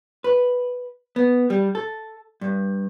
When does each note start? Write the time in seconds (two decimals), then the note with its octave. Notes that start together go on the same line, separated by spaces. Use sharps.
0.24 B4
1.16 B3
1.50 G3
1.75 A4
2.41 G2